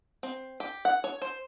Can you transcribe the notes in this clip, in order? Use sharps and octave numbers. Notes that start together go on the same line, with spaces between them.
C4
G4
F#5
C#5
C5